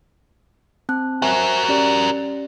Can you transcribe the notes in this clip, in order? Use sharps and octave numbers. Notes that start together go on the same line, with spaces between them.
C4 A5 F#6
F#4 A#4 C5 E5 G#5
C#4 G4 D5